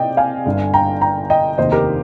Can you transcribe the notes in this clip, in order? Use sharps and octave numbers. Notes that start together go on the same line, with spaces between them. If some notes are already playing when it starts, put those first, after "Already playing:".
Already playing: C3 C4 D5 D#5 G5
F5 G#5
G1 G2 D3
G5 A#5
G5 A#5
D#5 G5
F1 D#2 D#3 C5 D#5
G4 A#4